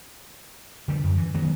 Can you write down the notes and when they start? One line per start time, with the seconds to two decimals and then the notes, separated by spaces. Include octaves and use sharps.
0.88 D3 F3 G3
1.03 F#2
1.18 E3
1.34 D#3 F#3 G#3 B3